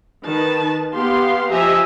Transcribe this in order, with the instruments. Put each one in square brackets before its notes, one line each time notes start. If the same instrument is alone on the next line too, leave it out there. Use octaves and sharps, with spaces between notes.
[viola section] D#3 B4 A5
B3 G4 F5 C6
F3 G4 D#5 E5 G#5 A#5